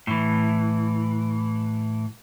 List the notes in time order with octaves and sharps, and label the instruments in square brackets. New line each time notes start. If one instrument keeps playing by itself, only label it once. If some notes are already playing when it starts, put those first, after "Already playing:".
[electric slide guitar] A2 E3